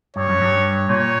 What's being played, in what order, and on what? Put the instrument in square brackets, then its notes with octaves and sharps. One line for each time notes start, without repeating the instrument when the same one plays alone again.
[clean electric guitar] G2 [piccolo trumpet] C#5
[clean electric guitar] F#2
G2
[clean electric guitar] A#2 [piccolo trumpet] C#5